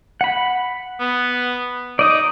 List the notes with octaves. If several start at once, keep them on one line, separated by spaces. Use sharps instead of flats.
F#5 B5
B3
D#4 D5 D#5 D#6